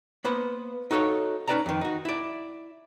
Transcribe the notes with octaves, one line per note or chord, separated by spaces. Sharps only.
A#3 B3 B4 C5
D#4 F#4 A4 C#5 F5
C#4 D#4 B4 D5 A5 A#5
F2 D#3
D#4 F#4
E4 D5